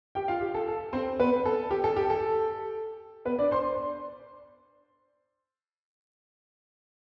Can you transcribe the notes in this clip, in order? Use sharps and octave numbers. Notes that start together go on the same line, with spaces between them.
G4 G5
F4 F5
G4
A4
A4
C4 C5
B3 B4
A4
G4
A4
G4
A4
B3 B4
D4 D5
C5 C6